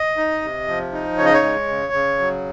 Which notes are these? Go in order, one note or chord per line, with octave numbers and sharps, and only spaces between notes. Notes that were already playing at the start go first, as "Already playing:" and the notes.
Already playing: D#5
D#4
C3
F3
D#4
C#3 C#5
D#5
C#5
G#3
C#3
C#3
F#3